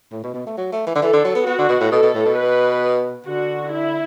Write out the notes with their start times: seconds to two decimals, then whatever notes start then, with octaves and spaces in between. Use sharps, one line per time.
0.12 A2
0.23 B2
0.34 B2
0.47 A3
0.57 F#3
0.72 A3
0.87 E3
0.95 D3
1.02 E3 A4
1.13 D3
1.24 F#3
1.35 B3
1.47 B3 F#4
1.58 D3
1.69 B2
1.80 A2
1.92 B2 A4
2.03 B2
2.14 A2
2.26 B2
2.37 B4
3.26 D3 F#4
3.72 E4